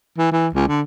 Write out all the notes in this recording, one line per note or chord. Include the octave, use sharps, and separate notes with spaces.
E3
E3
C#2
D3